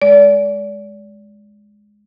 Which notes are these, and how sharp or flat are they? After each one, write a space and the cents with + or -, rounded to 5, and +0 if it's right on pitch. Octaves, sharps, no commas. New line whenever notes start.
G#3 +0 D5 -30